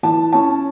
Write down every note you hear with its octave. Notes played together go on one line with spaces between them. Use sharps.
E3 A5
C#4 E4 A5